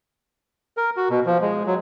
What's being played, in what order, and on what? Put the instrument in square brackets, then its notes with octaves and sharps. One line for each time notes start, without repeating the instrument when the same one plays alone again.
[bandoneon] A#4
F#4
B2
F3
G#3
F#3